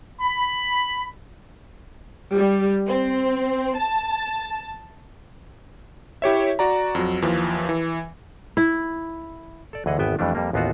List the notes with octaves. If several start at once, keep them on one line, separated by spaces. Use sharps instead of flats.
B5
G3
C4
A5
E4 G4 C#5 E5
F#4 D5 A#5
F2 F#3
D#2 E3 F3
E3
E4
A4 D5
D2 E3 G#4 D#5 F#5
G#1 E2 B3 E5 G5 G#5
F2 E3 G3 A3 D4
F2 G3 A#3
A1 D#2 B3 C4 F4 F#4